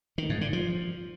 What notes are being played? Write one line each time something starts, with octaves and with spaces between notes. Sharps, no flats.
D#3
G#2
D3
F3